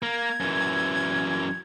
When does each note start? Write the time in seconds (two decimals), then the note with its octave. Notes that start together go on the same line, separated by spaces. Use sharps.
0.03 A#3 G#6
0.41 F#2 E3